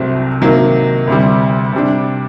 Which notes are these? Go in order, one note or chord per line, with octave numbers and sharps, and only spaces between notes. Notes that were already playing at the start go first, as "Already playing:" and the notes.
Already playing: C2 C3 F#3 A3 C4
C3 D#3 F#3 A#3
D2 C3 G3
C3 G3 D4